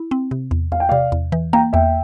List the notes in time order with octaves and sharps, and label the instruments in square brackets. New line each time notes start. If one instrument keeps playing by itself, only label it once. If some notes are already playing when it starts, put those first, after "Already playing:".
Already playing: [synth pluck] E4
C4
C3
E2
[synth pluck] E2 [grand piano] F5
[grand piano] G5
[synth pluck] C3 [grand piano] D5 F5
[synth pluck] E2
E3
[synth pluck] A#3 [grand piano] G5 A#5
[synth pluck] E2 [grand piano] E5 G5